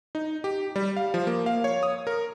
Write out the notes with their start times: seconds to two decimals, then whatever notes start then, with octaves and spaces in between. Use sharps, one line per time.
0.15 D#4
0.44 G4
0.76 G3
0.97 F5
1.14 F3
1.27 A#3
1.46 F5
1.64 C#5
1.83 D#6
2.07 A#4